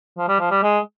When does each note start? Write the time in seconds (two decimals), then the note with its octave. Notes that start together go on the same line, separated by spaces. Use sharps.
0.17 F3
0.29 G3
0.40 F3
0.51 G3
0.63 G#3